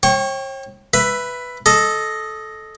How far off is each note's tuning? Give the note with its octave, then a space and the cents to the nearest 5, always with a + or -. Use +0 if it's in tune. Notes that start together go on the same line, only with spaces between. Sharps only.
C#5 -45 G5 +0 C#6 +0
B4 +0 E5 +10
A4 -10 D#5 +0